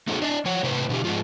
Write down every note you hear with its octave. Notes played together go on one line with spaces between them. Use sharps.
A3 B3 D#4 F#4 G#4 A4
D4 D5 D#5
F3 C#5 F#5
A2 C3 B4 C5
B2 D3 E3 G4
G#2 D#3 F3 G#3 F4